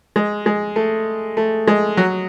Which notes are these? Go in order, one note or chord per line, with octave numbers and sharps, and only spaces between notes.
G#3
G#3
A3
A3
G#3
F#3